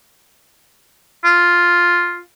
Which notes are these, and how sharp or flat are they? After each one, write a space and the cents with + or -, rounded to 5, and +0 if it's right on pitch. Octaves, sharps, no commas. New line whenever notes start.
F4 +0